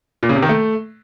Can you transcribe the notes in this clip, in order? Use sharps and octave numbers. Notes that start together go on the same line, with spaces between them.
A#2
C#3
C3
D#3
A3